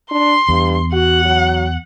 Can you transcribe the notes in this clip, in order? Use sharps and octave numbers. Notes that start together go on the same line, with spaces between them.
D4 C6
E2 G2
F#4 F#5
F#3